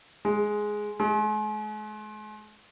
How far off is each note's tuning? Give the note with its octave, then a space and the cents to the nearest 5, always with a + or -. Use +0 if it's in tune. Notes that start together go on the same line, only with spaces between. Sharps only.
G#3 +5
G#3 +40